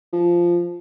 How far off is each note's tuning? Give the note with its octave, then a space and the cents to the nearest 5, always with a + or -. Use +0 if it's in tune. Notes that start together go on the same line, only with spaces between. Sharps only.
F3 -10